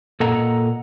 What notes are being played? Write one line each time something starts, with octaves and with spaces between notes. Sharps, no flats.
A#2 A4 D#5 F#5 A#5